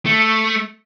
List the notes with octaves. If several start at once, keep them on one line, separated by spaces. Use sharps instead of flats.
A3